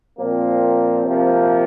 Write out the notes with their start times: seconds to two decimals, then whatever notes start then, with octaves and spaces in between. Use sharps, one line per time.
0.19 A#2 F3 A#3 C4
1.04 C3 F3 A#3